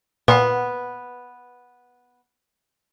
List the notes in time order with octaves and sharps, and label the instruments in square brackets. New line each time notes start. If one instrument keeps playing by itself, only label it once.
[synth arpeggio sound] A#2 [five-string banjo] B3 [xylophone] B4 F#5